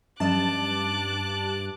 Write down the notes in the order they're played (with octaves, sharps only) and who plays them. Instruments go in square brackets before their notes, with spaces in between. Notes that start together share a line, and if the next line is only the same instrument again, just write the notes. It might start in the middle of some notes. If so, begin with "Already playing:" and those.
[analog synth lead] G2 [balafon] F3 F#3 C#4 [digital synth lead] A5 [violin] D6 F#6